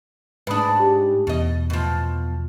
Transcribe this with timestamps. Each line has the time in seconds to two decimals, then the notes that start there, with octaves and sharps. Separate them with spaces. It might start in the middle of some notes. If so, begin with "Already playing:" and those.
0.47 G#2 D4 B4 B5 D#6
0.80 G4
1.27 E2 B2 D#5
1.70 B2 F3